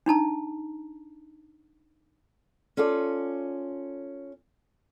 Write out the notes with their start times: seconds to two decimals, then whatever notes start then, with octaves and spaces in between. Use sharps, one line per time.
0.06 D4 D#4 A5 A#5
2.77 C#4 F4 A4 D5